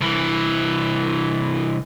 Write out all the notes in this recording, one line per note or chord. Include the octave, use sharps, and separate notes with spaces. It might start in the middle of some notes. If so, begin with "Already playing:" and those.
C2 E3